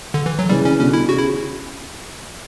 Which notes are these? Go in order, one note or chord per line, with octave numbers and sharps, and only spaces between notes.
D3
E3
F#3
C#3 E3 G3
C#4
B2 D3 C#4
E4
C#3 F#4
E4